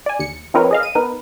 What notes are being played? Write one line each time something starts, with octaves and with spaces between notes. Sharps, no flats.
D5 G#5
D#2 C#7
F3 C4 D#4 A#4 B4 C#5
G#4 D#5 F5
D#7
B3 D#4 A#4 B4